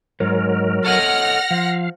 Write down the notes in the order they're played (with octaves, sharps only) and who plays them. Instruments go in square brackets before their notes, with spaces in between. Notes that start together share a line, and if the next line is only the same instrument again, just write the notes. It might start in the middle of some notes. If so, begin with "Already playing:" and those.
[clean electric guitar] G#2 [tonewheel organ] F#3 A#4
[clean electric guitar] A4 C#5 D#5 [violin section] F#5 F6 A#6
[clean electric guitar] F3 [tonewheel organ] F5